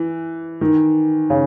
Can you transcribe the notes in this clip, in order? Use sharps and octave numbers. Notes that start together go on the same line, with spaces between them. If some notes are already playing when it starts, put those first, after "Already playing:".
Already playing: E3
D#3
C#3